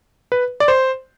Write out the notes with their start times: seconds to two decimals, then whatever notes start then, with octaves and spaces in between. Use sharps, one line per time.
0.32 B4
0.60 D5
0.68 C5